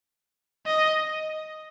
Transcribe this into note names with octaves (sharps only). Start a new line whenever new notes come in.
D#5